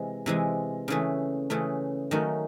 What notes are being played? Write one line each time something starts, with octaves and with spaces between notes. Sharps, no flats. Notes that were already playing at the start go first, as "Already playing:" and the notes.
Already playing: C3 E3 G#3
C3 E3 G#3
C#3 E3 A3
C#3 E3 A3
D#3 F#3 A3 C#4